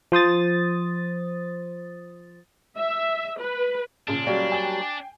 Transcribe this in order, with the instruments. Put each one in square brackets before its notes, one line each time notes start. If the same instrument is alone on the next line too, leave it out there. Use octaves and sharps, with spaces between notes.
[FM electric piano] F3 C5 D#6 A6
[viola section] E5
B4
[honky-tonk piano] A#2 C#3 [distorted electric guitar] D4
[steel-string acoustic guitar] F#3 G3 A#3
[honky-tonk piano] G5 G#5 F#7